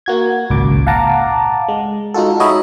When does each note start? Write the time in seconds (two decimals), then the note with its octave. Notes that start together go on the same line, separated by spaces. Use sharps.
0.06 A#3 F#4 G#6
0.50 G#1 C#2 A#2 D6
0.87 F5 F#5 A5 A#5 D6
1.68 G#3
2.14 G#3 D#4 F4 F#4 A4
2.40 D#4 F#4 C#5 D#5 E5 B5